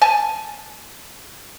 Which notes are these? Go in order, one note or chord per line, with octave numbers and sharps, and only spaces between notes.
G#5 A5